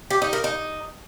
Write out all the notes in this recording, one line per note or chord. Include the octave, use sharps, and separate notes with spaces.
G4
D#4
A#4
D#4